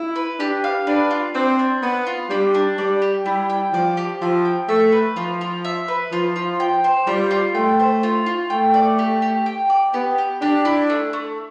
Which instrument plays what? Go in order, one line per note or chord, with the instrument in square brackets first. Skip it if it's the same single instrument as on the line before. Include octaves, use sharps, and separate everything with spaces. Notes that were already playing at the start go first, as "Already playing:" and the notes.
Already playing: [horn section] E4
[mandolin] B4
[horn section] D4 [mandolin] G4
[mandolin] F5
[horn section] D4 [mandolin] B4
[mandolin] F4
[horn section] C4 [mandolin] D4
[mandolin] D4
[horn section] B3 [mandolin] B4
[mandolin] F4
[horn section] G3 [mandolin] D4
[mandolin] D4
[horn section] G3 [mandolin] D5
[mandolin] G4
[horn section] G3 [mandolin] E4
[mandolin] G5
[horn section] F3 [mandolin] D5
[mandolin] G4
[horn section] F3 [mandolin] E4
[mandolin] G5
[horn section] A3 [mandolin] E5
[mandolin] B4
[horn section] F3 [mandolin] F4
[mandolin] F4
E5
B4
[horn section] F3 [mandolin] F4
[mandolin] F4
G5
C5
[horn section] G3 [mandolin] F4
[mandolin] F4
[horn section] A3 [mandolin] G5
[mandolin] C5
F4
F4
[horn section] A3 [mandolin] G5
[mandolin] D5
G4
G4
G5
D5
[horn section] B3 [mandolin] G4
[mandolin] G4
[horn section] D4 [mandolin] G4
[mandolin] E4
A3
A3